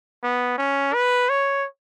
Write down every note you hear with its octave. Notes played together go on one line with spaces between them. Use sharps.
B3
C#4
B4
C#5